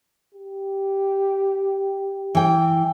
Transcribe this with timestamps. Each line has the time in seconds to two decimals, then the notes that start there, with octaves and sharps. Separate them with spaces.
0.34 G4
2.35 E3 G5